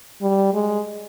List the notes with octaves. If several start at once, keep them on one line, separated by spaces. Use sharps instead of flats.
G3
G#3